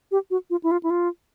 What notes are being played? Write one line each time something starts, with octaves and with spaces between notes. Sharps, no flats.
G4
F#4
F4
E4
F4
E4
F4